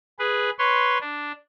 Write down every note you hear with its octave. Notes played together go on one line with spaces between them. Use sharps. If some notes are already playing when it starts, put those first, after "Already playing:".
G#4 B4
B4 C#5 C6
D4